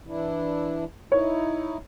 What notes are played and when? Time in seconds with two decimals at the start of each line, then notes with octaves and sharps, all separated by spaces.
0.07 E3 D4 E4
1.12 D#4 E4 C#5